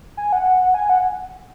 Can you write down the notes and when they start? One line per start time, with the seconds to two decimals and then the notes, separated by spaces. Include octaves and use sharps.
0.17 G#5
0.33 F#5
0.74 G#5
0.90 F#5